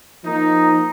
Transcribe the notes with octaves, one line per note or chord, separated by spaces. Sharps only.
F3 A#3 D#4